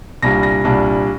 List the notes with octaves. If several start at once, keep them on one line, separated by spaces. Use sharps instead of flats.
C2 A#2 G3 D4 A#6
A#6
C2 A#2 G3 D4